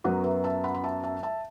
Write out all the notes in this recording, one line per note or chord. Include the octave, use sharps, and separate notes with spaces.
F#2 F#3 B3 F#4 B4
B4 E5
E5 A5
F#5 B5
B5
E5 A5
E5 A5
E5 A5